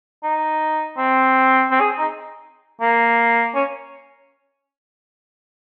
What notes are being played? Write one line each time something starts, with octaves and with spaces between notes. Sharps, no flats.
D#4
C4
C4
G#4
D#4
A#3
C#4